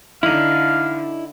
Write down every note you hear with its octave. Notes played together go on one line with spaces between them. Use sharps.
D3 D#4 E4 F5